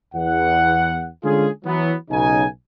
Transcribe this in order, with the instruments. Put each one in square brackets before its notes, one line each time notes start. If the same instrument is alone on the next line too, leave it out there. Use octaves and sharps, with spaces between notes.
[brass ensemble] E2 F#5
D3 G#3 C#4 F4 G#4
E3 F#3 B3
B1 C#3 D#4 G#5